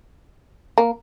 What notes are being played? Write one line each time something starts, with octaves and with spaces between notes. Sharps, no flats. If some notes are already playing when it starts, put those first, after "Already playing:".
A#3